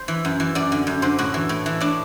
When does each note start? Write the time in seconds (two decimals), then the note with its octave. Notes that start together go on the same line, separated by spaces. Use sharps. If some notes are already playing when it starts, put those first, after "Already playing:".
Already playing: C5
0.08 E3
0.25 F#2
0.40 E3
0.55 F#2 D5
0.72 D3
0.87 F#2
1.02 D3 C5
1.18 A2 F#4
1.34 E3
1.49 A2
1.66 E3
1.81 A2 D4